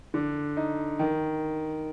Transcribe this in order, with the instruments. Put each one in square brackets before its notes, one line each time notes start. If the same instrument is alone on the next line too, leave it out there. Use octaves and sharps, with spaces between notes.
[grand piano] D3
D#4
D#3